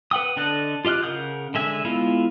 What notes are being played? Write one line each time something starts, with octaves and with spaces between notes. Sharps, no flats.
B4 F#5 G5 D#6
D3 D4 A4 D#5 F#6
F4 G4 D#5 F6 F#6
C#3 A#4 F#5 D#6 G6
D3 G#3 E5 G#5
G#3 B3 E4 F4